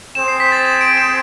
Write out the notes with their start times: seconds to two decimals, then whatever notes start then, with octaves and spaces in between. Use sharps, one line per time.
0.15 C4 G#4 C5 E7
0.28 C7
0.40 B6
0.52 A6
0.65 E7
0.81 D7
0.97 E7